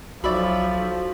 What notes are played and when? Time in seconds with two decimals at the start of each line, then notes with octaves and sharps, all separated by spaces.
0.24 B1 F3 F#4 D5 E5 B5